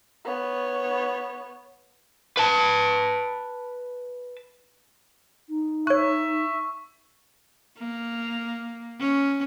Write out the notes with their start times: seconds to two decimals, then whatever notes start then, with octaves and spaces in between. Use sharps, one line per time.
0.25 B3 C#5
2.37 B4 A5
5.49 D#4
5.87 C#5 E5 C#6 F#6
7.78 A#3
9.00 C#4